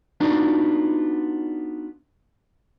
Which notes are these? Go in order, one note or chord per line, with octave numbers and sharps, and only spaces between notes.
B3 D4 D#4 F4 F#4 D5